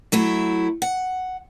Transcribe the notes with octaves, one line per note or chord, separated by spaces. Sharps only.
F#3 A3 E4
F#5